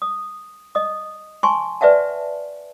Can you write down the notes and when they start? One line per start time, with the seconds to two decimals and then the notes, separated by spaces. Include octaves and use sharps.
0.02 D#6
0.75 D#5 D#6
1.43 G#5 A5 C6 C#6
1.81 B4 D5 E5 F#5 A5